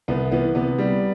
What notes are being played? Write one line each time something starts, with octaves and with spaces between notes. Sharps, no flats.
C2 B3
E3 B3
C3 B3
G3